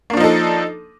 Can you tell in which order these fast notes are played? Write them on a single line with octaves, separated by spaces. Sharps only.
A#3 D4 F3 D#4 A4